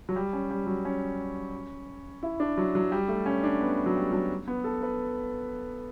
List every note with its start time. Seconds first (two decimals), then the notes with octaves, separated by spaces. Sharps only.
0.09 F#3
0.16 G3
0.33 C#4
0.50 G3
0.67 F#3
0.85 C#4
2.23 E4
2.40 D4
2.57 F#3
2.75 F#3
2.92 G3
3.08 A3
3.26 C#4
3.44 D4
3.61 B3
3.86 F#3
3.96 G3
4.13 F#3
4.48 B3
4.64 A4
4.82 B4